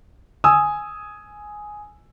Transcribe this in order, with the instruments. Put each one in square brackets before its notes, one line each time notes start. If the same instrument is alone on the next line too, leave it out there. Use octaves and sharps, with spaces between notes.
[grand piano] G#5 D#6 E6